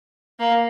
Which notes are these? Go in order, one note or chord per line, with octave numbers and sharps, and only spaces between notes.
A#3